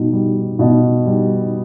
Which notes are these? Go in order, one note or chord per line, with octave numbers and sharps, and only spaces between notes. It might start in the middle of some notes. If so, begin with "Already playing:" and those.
Already playing: B2 G3 D#4
G3
B2
G3